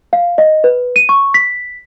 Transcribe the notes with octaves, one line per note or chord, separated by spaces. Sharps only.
F5
D#5
B4
D#7
C#6
B6